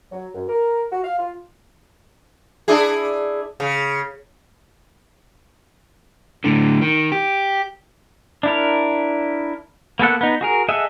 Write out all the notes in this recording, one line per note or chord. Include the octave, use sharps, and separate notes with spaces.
F#3
F#2
A#4
F#4
F5
F4
D4 E4 G#4
C#3
A2 D3
D#3
G4
D4 E4 A#4
A#3 B3 A4 F#5
B3 D#4
F#4 G#4 A#4
G#4 A4 D#5 E5 F#5